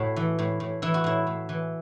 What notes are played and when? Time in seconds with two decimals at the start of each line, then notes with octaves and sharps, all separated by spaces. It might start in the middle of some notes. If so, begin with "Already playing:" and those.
Already playing: A2 F#4
0.16 E3
0.39 A2
0.60 A2
0.82 E3 E4
0.94 F#4
1.04 A2 E4
1.27 A2
1.49 E3